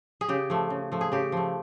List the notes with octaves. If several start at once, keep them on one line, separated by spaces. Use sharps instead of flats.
G#4
C#3 G4
F3 A3
C#3
F3 A3
G#4
C#3 G4
F3 A3